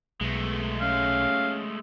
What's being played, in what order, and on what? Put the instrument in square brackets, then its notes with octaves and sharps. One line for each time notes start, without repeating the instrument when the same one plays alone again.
[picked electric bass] B1 [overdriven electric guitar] G#3 A3 [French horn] B3
[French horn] C#4 [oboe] F5